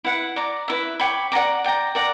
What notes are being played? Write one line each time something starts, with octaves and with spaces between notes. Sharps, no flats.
E4 B4 F#5
D5 A#5 D6
E4 B4 E5
C#5 G5 B5 D6
D5 F#5 A#5 D6
D5 G5 A#5
A#4 D5 F#5 A#5